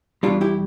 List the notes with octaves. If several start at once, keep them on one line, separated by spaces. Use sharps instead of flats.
E2 B2 G3 D4 F4
E4 G4